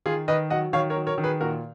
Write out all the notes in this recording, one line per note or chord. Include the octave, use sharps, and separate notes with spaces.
D#3 F4 G#4
D#3 B4 D#5
F#3 D#5 F#5
D#3 C#5 F5
A#4 C#5
F#3
A#4 C#5
D#3
G#4 B4
A#2 F#4 A#4